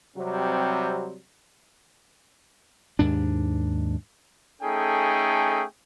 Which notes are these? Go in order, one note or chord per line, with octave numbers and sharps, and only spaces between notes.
C3 F#3 G3 C4
D#2 G#2 D4
A3 C#4 D#4 G#4 A4 G5